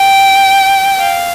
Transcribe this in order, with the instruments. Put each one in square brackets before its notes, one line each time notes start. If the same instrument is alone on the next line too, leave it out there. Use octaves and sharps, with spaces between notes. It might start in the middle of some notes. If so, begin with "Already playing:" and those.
Already playing: [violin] G5
F5